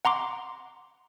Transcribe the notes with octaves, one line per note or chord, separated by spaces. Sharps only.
F#5 A#5 C6 D6